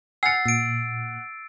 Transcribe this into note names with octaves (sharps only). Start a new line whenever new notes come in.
F#5 G#5 E6 F6 A6 C7 C#7
A#2 E6 D7